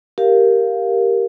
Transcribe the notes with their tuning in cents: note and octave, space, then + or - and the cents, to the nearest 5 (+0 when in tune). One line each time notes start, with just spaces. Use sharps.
G4 +0 A#4 +0 F5 +0